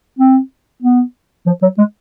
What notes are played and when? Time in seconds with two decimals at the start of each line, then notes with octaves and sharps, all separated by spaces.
0.19 C4
0.82 B3
1.46 F3
1.62 F#3
1.78 G#3